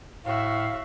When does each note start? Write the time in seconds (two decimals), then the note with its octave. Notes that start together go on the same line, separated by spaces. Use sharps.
0.25 A2 F#4 E5 F5